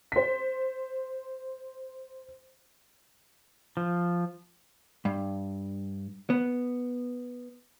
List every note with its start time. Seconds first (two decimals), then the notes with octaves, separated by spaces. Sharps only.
0.12 C5 B6
3.77 F3
5.05 G2
6.30 B3